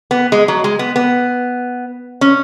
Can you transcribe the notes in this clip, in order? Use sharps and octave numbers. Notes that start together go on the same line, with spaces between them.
B3
G#3
F#3
G#3
B3
B3
C#4